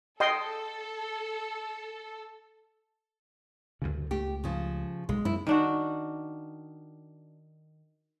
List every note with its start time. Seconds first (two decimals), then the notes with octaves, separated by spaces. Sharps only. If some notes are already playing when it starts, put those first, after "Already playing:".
0.20 A4 D#5 G5 C6
3.82 D2 G2 C#3
4.11 C#2 A3 G4
4.44 C#3 F3
5.09 B1 G#3
5.25 F#2 E4
5.47 D#3 D4 F#4